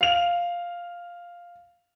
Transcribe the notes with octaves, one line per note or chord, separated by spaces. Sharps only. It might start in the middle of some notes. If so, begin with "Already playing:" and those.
F5 F7